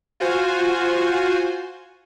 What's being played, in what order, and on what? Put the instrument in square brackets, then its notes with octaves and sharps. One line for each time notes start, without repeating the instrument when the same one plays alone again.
[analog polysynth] F4 F#4 C5 G#5